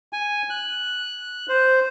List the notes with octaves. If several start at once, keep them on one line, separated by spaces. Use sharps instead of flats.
G#5
F#6
C5